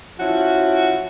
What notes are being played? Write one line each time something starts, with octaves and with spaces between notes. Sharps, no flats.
F3 C#4 E4 F#4